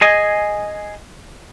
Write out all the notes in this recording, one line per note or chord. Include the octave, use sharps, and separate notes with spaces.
G#4 D#5 G#5